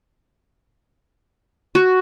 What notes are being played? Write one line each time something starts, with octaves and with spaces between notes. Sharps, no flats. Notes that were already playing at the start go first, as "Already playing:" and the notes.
F#4